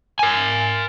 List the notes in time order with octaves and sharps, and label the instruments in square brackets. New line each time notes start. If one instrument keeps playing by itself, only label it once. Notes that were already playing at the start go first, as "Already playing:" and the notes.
[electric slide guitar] A#4 G#5